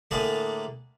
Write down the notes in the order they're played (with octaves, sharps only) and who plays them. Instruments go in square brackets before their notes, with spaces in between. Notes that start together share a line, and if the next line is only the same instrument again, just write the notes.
[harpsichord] A2 D3 A#3 D4 G#4 A5